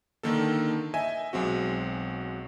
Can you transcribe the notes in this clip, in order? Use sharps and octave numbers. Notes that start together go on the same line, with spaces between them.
D3 D#3 A#3 A4
D#5 E5 G#5
B1 G#3 C4 F#4